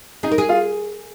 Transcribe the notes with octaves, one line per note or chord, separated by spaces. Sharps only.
D#4 G#4
A#4
G#4
F4